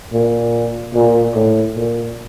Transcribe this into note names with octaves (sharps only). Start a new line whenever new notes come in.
A#2
A#2
A2
A#2